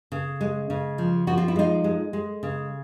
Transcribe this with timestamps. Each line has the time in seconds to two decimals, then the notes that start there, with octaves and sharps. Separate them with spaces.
0.12 C#3
0.41 G#3
0.70 C#3
0.98 F3
1.27 F3 F#4
1.38 F4
1.48 E4
1.56 G#3 D#4 F4
1.84 G#3
2.13 G#3
2.43 C#3